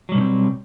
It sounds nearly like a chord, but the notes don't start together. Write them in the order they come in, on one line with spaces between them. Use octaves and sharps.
F#3 G3 B2 C#4 C4